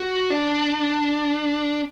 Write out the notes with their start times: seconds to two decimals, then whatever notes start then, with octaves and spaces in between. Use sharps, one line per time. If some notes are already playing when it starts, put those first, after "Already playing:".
Already playing: F#4
0.30 D4